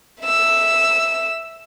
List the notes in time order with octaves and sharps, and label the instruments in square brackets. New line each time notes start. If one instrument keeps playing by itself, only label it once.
[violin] E5 E6